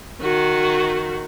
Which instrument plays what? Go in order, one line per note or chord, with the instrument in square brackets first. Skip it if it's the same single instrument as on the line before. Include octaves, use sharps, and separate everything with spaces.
[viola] D#3 F#4